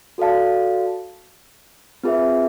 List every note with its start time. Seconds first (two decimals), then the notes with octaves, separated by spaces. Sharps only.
0.18 F#4 A4 D5 F5 A5
2.03 C4 F4 G#4 B4 E5